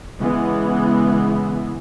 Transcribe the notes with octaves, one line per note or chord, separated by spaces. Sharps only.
C#3 E3 G#3 B3